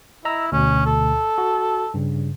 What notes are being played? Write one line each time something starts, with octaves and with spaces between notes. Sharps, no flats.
E4 D#5 A#5 E6
D2 B2 C#4
A4
F#4
G2 C#3